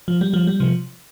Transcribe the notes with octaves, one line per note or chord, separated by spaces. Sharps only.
F3
G3
F3
G3
C3 F3